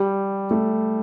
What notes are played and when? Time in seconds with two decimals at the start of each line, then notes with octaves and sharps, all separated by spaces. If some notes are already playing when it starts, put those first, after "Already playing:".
Already playing: G3
0.51 A3